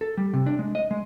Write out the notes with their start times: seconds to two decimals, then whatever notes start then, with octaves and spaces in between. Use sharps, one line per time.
0.01 A4
0.17 G3
0.34 C3
0.46 D4
0.59 G#3
0.75 D#5
0.91 G#3